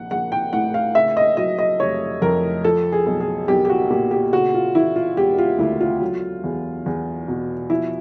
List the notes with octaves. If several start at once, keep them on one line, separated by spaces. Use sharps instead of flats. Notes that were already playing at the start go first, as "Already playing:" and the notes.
Already playing: A#1 F#5
A#1 F#5
G5
A2 F#5
F5
C#3 E5
D#5
F#3 D#5
D#5
F1 C#5
F2 A#4
F3 A4
G#4
B1
G#4
B1 G4
G4
F#4
A#2 G4
G4
C#3 F#4
F4
E3 E4
F4
E1 G4
F4
D2 E4
F4
F#3
E2
E2
B2
F3 E4